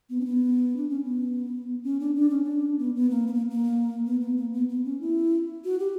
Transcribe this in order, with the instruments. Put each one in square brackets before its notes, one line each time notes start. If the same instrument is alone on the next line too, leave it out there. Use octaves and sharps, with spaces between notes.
[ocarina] B3
C#4
B3
D4
C#4
B3
C#4
D4
D4
C#4
D4
B3
B3
A#3
B3
A#3
A#3
B3
B3
A#3
B3
B3
C#4
E4
F#4
G4